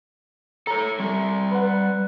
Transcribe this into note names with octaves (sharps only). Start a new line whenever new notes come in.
A4 C#5 A#5
G3 E5
B4 F#5